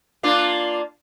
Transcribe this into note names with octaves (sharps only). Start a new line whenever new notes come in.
A#3 D4 F4